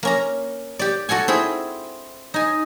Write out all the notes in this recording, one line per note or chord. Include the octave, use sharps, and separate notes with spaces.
A#3 C#4 A#5
G4 D5
F#4 A4 F#5 G#5
C4 E4 G#4
D#4 G#5